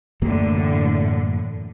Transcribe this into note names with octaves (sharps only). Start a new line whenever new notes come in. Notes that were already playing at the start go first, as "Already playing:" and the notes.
F#2 A2 D3 E3 A#3